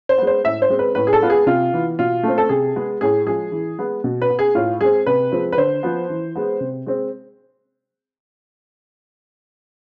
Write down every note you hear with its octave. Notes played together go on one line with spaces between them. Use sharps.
C5
G#3 B3
C5
A2 E5
C5
G#3 C4
B4
A2 B4
G#4
A4
G#3 B3 F4
G#4
C3 F4
E3 B3
B2 F4
A3 C4
A4
C3 G#4
G#3 B3
A2 G#4
F3 G#3 G#4
E3
G#3 B3
B2
B4
B3
G#4
A2 F4
G#3 C4 G#4
C3 B4
F3 G#3 C4
B4
D3 C5
F3 B3
E3
G#3 B3
C3
G#3 C4